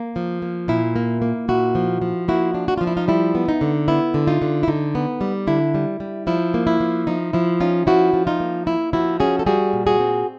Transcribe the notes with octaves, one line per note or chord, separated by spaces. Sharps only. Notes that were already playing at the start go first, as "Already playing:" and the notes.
Already playing: A#3
F3
A#3
A#2 E4
A#3
A#3
A#2 E4 F#4
F3
F3
A#3 E4 F#4
D4
F#4
F3 F4
E4
D#4 F4
G3 E4
B3
D#4
D3
B3 E4
D3
D#4 F4
D3
E4
D3 D#4
B3
G3
D3 E4
G3
G3
F3 E4
A#3
E4
F3
F3 D#4
F3 E4
C#4 D#4 F4
F3 E4 F#4
F3
D#4 F4
A#3
A#3 E4
F3 E4 F#4
C#4 F#4 G#4
A4
G3 F#4 G#4
A#2
F#4 G#4
C4